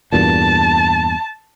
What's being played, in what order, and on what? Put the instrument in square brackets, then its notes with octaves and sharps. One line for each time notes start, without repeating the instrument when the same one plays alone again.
[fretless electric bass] E2 G2 A#2 [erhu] A5